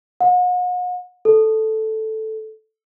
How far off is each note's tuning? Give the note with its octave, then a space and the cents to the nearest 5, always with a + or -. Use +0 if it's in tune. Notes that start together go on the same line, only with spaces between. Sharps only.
F#5 -40
A4 -5